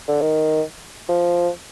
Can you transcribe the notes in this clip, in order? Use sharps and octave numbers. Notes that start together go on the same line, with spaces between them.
D3
D#3
F3